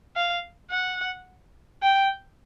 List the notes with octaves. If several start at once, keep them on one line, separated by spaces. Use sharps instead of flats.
F5
F#5
G5